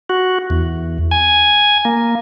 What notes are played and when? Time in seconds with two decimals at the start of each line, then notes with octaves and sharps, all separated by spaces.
0.09 F#4
0.50 E2
1.11 G#5
1.85 A#3